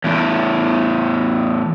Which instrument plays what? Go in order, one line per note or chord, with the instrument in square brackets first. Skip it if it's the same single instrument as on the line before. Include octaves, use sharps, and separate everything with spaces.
[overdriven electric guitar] E2 A2